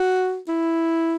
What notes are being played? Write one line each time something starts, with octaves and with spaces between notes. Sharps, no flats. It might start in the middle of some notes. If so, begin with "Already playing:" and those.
Already playing: F#4
E4